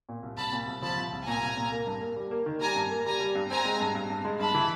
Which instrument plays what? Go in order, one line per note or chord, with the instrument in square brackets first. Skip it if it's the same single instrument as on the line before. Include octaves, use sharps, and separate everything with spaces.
[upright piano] A#2
C2
[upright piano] C2 [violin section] A5 B5
[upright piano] A#2
C2
[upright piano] F3 [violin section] A5 B5
[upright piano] C2
C2
[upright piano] A#2 [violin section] G#5 A#5
[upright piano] C2
A#2
A#3
G2
A#3
G3
A#3
D#3
[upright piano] G3 [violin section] G#5 A#5
[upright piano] G2
A#3
[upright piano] G3 [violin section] G#5 A#5
[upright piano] G3
G2
[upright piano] C4 [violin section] G#5 A#5
[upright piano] G#3
G2
G2
G2
G#3
[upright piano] G2 [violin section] A5 B5
[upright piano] E3